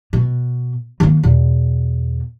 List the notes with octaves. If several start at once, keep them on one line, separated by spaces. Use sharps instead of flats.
B2
D#3 A#3
E2 B2